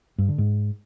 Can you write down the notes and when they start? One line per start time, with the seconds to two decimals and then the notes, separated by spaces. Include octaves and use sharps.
0.18 G2
0.28 D3
0.38 G#2